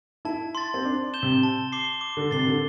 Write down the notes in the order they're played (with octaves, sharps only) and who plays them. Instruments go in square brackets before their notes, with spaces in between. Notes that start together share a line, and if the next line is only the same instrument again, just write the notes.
[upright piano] E4 [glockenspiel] A5
[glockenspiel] C6 A6
[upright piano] C4
[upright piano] D4 [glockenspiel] C6
[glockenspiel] G6 E7 G7
[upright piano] C3
[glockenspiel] A5
D6 C7 G7
D6
[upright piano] D3
[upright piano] C3 [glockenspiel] A6 C7 G7
[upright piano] D3